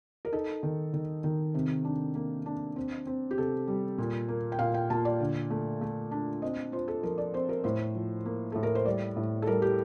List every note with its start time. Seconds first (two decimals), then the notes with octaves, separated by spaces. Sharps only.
0.25 A#4
0.32 D#4 A4
0.63 D#3
0.93 D#3
1.24 D#3
1.55 C3
1.85 D4
2.15 A#3
2.46 D4
2.76 C4
3.07 C4
3.31 G4
3.37 C3 A4
3.68 G3
3.98 A#2
4.28 A#3
4.52 G5
4.59 A#2 F5
4.74 G5
4.90 A#2 A5
5.05 D5
5.20 D3
5.50 A3
5.81 A3
6.11 D4
6.42 C4 D#5
6.72 F4 C5
6.88 A4
7.03 F3 A#4
7.18 D5
7.34 C4 C5
7.49 A#4
7.64 A2 C5
7.95 F3
8.25 A#3
8.52 A2 A4
8.63 A#4
8.75 C5
8.86 G3 D5
9.17 A2
9.42 A4
9.47 G3 A#4
9.62 G4